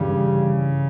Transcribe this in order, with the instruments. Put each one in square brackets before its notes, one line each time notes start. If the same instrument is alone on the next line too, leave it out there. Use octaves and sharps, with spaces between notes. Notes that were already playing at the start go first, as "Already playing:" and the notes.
Already playing: [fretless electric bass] G2 E3 G3 [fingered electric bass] C#3